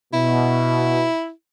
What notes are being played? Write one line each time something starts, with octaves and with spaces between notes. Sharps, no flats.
B2 E4